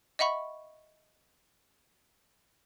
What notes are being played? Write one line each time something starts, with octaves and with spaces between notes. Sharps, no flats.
D#5 E5 F#5 B5 C#6